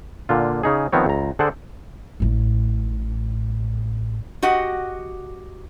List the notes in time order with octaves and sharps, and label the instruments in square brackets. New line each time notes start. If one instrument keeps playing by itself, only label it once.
[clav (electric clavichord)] A#2 D3 F4
C#3 D#4 G#4
D#3 F3 B3 C4 C#5
C#2 A#5
D3 G#4 A4 C5 D5 F#5
[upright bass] A1 A2
[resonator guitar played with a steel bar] F#4 G4 D#5 F#5